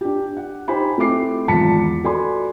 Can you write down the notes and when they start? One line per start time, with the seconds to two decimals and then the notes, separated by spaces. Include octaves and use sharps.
0.01 D4 G4
0.37 F#5
0.68 D#4 G4 C5 G#5 B5
0.98 A3 C4 E4 D6 C7
1.48 G#1 E2 F4 A5 B6 C#7
2.04 F#4 A4 D5 G#5 B5 C6